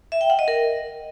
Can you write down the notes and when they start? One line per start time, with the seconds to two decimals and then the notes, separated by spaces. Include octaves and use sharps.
0.12 E5
0.21 G5
0.30 F#5
0.39 D#5
0.48 A#4